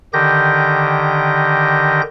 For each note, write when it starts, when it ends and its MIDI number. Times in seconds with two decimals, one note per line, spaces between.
0.13 2.02 50
0.13 2.02 51
0.13 2.02 67
0.13 2.02 91
0.13 2.02 94